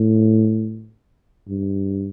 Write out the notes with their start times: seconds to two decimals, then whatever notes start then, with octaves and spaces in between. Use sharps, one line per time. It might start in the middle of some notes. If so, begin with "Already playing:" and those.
Already playing: A2
1.48 G2